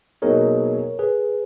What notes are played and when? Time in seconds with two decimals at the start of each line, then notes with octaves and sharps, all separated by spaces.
0.22 B2 F#3 A#3 D#4 G#4 A#4 C#5
0.99 G#4 B4